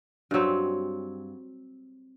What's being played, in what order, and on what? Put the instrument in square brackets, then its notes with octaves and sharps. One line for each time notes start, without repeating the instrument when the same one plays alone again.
[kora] G2 F#3 C4